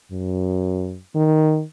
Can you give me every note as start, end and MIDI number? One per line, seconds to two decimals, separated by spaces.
0.12 0.99 42
1.15 1.63 51